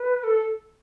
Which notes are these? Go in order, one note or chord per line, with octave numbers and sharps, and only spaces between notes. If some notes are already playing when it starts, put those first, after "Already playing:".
Already playing: B4
A4